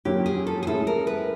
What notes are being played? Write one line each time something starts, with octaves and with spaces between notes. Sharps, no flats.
A#2 F#3 A#3 C#4 G4
G#4
A4
G#4
A2 E3 G#3 C#4 A4
A#4
B4